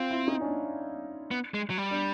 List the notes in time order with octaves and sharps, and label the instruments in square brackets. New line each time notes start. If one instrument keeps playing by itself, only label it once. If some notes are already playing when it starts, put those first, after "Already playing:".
Already playing: [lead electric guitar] C4 [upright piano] F4
[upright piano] E4
D#4
C#4
D4
[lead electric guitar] B3
G#3
F#3
G3
[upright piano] D4